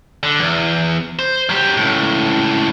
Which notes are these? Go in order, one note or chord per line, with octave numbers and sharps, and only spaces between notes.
D3
E2
C5
F#3 G4
C#2 A2